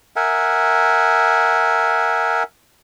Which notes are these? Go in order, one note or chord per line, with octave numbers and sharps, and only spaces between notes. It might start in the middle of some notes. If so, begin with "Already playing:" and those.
A#4 E5 F#5 G#5